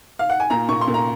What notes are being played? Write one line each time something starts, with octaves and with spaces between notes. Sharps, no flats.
F5
F#5
G#5
A#2 A#5
A#2 C#6
C6
A#2
A#5